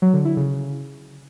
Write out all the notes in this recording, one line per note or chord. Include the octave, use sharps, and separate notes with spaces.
F#3
D3
E4
C#3